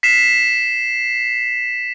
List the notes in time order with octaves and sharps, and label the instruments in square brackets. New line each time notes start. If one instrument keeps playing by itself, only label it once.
[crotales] B6 C7 E7